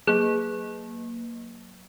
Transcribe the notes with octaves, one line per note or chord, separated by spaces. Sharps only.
F#3 A#3 G#4 F#6